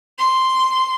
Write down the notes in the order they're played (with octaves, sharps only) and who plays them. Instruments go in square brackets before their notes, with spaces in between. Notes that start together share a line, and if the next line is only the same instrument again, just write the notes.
[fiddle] C6